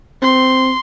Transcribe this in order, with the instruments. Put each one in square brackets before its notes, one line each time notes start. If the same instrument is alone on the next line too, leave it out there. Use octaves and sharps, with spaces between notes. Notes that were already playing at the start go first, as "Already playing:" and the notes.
[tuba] C4 [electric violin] C6